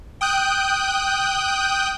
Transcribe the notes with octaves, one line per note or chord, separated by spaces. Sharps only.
G5 D#6 F#6 G6